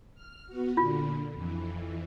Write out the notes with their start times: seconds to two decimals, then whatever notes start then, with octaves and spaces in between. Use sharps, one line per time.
0.15 F6
0.47 B3 F#4
0.77 A#2 D3 F4
1.32 F2 E3